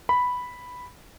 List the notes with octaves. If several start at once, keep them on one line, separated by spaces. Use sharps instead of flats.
B5